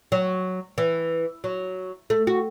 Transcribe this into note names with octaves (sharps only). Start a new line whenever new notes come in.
F#3
E3
F#3
A3
F#4